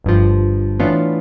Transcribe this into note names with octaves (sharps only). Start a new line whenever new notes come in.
G1 G2 F3
A2 E3 B3 D4 F4